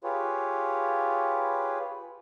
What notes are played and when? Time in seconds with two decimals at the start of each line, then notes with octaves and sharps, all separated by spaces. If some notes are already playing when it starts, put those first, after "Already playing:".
0.04 F4 G4 G#4 B4 C#5